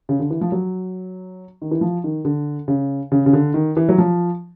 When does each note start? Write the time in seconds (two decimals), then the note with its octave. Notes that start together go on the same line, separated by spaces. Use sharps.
0.09 C#3
0.19 D3
0.30 E3
0.41 F3
0.52 F#3
1.62 D#3
1.71 E3
1.81 F3
2.04 D#3
2.25 D3
2.68 C#3
3.12 C#3
3.26 C#3
3.33 D3
3.54 D#3
3.77 E3
3.89 F#3
3.98 F3